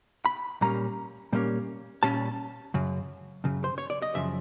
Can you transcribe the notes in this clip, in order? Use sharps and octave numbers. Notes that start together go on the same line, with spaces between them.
B5
A#2 G3 A#3 C#4 A#5
A#2 G3 A#3 C#4
A#2 G3 A#3 C#4 A5
F#2 C#3
F#2 C#3
C5
C#5
D5
D#5
F#2 C#3 F3 E5